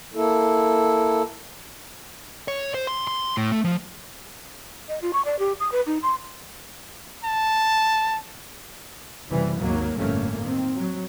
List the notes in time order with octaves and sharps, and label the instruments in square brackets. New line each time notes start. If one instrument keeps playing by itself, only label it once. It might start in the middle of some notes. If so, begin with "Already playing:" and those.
[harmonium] A#3 E4 A4
[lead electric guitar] C#5
C5
C6
C6
A2
A3
F3
[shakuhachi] D#5
F4
C#6
D5
G4
D#6
B4
D#4
C6
[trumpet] A5
[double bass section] F#1 C3 E3 G3
G#1 D#2 F#3 A#3
G1 F2 A2 A3 A#3 C#4
D#3 C4
F#3